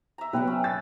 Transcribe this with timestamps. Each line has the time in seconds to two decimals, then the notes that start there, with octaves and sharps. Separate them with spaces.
0.18 E5 A#5
0.33 B2 F#3 B4 E5 F#5 G5
0.47 C#4
0.64 E6 A6